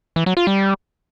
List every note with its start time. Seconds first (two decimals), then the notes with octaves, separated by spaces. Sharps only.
0.16 E3
0.26 F#3
0.37 F4
0.47 G3